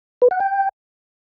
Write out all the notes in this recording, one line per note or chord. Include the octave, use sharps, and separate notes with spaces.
B4
F#5
G5